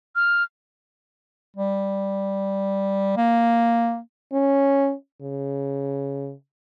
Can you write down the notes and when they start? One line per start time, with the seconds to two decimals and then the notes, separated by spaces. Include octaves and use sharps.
0.16 F6
1.57 G3
3.17 A#3
4.33 C#4
5.22 C#3